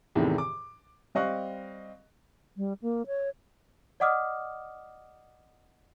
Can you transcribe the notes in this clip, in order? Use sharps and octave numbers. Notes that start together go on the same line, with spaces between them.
E2 A2 C3 D#3 E3
D6
G3 C4 D#5 F5 C#6 F#6
G3
A#3
C#5
D5 D#5 F#5 D6 D#6 F6